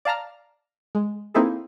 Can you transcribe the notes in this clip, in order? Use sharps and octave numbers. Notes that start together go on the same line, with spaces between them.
D5 F5 A5 A#5 F6
G#3
A#3 C4 D#4 E4 G#4 A4